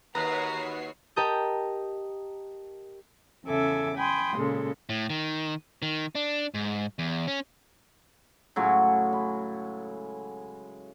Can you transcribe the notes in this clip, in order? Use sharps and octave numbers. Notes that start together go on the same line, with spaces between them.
D#2 F#4 B4 C#5 A#5 C7
G4 A#4 D#5 A5 D#6 G6
E2 C#3 A4 E5 G#5 D6
G5 G#5 B5 C6 D#6
A#2 C#3 G#3 A4
A2
D#3
D#3
D4
G#2
E2
C#4
A2 C#3 F#3 G#3
B5